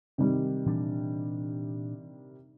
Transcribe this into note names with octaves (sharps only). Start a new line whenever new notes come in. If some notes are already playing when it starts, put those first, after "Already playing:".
C3 D#3 G3
A#2 E3 D4